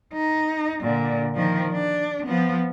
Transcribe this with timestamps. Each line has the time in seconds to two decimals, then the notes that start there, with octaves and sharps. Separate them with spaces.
0.14 D#4
0.82 A#2 D3
1.35 D#3 F3
1.72 D4
2.26 F3 B3